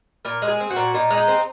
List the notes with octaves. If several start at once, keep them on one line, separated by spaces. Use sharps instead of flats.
A#2 A#4
G#3
G#4
C4
F#4
A#2
A#2 D#4
G#3
D#4
C4